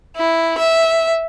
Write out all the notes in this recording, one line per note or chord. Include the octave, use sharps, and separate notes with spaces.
E4
E5